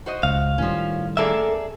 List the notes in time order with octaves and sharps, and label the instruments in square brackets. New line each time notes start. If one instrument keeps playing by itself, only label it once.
[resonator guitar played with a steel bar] F#4 C5 D#5
[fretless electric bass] C#2 [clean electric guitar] F5
[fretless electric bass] A2 D#3 G3 [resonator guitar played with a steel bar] F3 C#4
[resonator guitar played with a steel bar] F#2 A#3 A4 [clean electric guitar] G#4 D5 E5